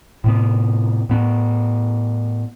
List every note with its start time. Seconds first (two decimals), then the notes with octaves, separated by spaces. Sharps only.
0.24 A2 C3 B3
1.09 A2 B3